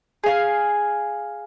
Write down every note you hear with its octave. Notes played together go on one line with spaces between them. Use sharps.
G#4 F5 G#5